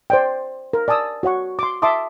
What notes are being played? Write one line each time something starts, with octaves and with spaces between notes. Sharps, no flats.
C5 D5 G5
A#4
D5 G#5 A5 D#6 E6
F#4 C#5 F#5 C#6
C6 D6
E5 A5 C6 D6 D#6